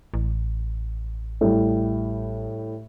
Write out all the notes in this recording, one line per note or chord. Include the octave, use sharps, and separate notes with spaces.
A1
A2 G3